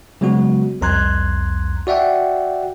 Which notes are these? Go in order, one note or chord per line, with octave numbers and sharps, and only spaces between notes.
C#3 F#3 G#3 B3 F#4
C2 F2 A#5 C6 F#6 G#6
F#4 D5 E5 F#5 G5